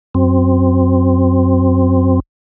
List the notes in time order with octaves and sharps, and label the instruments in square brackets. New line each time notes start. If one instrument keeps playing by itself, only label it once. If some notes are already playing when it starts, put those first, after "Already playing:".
[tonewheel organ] F#2 C4